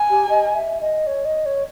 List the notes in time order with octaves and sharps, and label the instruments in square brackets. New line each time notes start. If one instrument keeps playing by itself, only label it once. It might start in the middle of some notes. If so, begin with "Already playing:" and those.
Already playing: [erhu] G#5
[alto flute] G4
D#5
E5
D#5
C#5
D#5
C#5